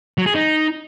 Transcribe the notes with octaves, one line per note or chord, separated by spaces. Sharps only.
F#3
G#4
D#4